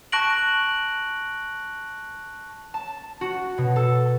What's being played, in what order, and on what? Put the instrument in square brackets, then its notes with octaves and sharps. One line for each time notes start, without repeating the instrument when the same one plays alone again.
[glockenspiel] A5 C#6 F#6 A#6 D7 F#7
[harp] A5
F#4
B2
A4